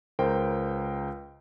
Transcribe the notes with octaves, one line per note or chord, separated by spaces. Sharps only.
C#2 A#4 C5 G5